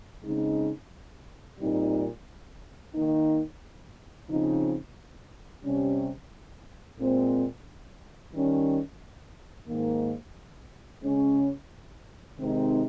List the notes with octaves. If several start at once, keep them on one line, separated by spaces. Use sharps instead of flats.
C#3 G#3 C4 D#4
A#2 G3 C4 D#4
D#3 A#3 D#4
C#3 F3 C4 D#4
C3 G3 C#4
A#2 G#3 C4
D#3 G3 C#4
G#2 D#3 A#3
C#3 G#3 C#4
C3 D#3 G#3 C4 D#4